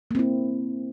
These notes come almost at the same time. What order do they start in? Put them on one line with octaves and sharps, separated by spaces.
A#3 C4 E4